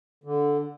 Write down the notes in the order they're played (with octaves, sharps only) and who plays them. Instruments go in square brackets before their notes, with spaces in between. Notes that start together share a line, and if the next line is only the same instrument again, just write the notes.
[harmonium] D3